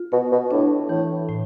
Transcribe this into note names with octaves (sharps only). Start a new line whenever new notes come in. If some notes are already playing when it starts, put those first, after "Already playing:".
Already playing: F4
B2 B3
B2
A2 D4
A2 E3
A2